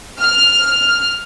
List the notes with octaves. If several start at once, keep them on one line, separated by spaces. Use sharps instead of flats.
F6